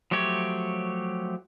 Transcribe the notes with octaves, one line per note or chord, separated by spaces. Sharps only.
F3 F#3 A3 G4 C#5